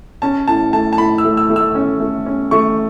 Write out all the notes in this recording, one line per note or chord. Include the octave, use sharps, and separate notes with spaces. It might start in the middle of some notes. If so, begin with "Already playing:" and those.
C#4 A5
A2 A5
A3 A5
A5
A2 B5
E6
A3
E6
A3
E6
C#4
A3
C#4
A3 C#6